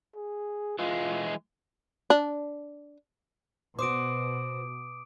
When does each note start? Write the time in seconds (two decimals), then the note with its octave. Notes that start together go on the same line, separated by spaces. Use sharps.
0.15 G#4
0.79 E3 G#3 F4
2.10 D4
3.79 B2 F#4 C5 D6 D#6 D7